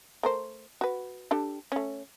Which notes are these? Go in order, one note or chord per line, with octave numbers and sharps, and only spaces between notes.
A3 A#4 C5
F#4 B4
D4 G4 A4
A3 C#4